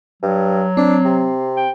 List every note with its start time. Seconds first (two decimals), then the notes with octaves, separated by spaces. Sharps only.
0.22 G2 F#3
0.77 C4 D4
1.05 C3
1.56 G5